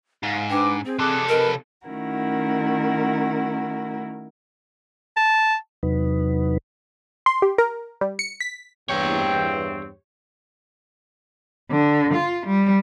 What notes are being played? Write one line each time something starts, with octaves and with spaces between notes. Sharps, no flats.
G#2 F5
D4 B4 G5 D6
C4 G#4 C5
C3 G#4 A4 D6 F#6
A#4 B4 D#5
D#3 A3 C#4 E4 F#4 A#4
A5
E2 C3 F#3 D#4 B4
C6
G4
A#4
G3
C#7
B6
E2 G2 C4 G4 C#5 G5
D3
F4
G3